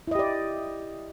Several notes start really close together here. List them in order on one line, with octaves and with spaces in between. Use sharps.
E4 D#5 G4 D5